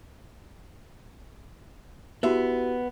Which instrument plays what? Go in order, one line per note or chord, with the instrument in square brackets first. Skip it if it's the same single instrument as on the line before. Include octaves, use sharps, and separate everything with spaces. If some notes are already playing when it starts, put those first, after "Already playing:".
[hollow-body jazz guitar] B3 E5 [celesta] E4 F#4 G4